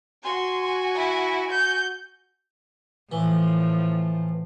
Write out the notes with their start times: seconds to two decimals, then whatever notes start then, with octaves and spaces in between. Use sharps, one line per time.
0.23 F#4 G#5 C6
0.95 E4
1.51 G6
3.12 A2 E3 F3